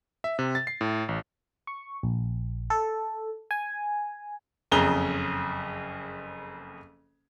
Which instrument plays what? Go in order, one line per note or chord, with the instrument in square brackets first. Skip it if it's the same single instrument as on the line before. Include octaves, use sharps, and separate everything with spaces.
[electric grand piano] E5
C3
A6
C7
A2
A1
[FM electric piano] C#6
A#1
A4
G#5
[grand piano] F#1 F2 C#3 G#4 A#5 G7